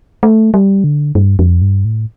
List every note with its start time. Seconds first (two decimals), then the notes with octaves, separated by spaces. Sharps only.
0.23 A3
0.54 G3
0.84 D3
1.15 G2
1.39 F2
1.62 G2
1.85 A2